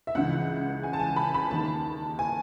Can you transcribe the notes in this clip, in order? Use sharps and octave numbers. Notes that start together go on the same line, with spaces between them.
E5
C#2 C#3 E3 F#5
G#5
A5
G#5
B5
B5
D#2 D#3 A5
G#5